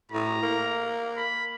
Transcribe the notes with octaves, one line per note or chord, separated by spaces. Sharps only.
A2 A#5
A#3
B5